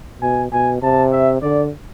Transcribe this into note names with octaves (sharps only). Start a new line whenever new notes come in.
B2 G#5
B2 G#5
C3 A5
E5
D3 D5